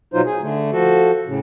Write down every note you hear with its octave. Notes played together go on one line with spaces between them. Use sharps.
B2 F#3 D#4 F4 C5
G#4
D3 A3
F3 F#4 A4
A2 C#3